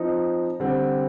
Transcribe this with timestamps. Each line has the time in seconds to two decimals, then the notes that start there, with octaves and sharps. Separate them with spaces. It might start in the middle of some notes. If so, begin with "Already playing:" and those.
Already playing: F3 C4 D#4
0.60 D3 G3 C4